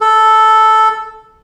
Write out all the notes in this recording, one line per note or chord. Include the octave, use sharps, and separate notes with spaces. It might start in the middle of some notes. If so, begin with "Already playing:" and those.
A4